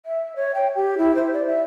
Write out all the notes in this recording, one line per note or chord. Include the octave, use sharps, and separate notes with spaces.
E5
C#5
G5
G4
E4
C5
D5
E5